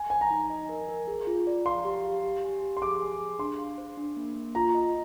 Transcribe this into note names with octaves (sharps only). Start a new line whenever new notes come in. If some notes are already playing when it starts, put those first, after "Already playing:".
Already playing: G#5
C5 G#5
A#5
D#4
D#5
A#4
A#4
G#4
F4
D5
F5 C6
G4
F5
G4
G#5
G4
C6
G#4 D6
G#5
G#4
D4 C6
F5
C5
D4
A#3
A#3
F4 A#5
D#5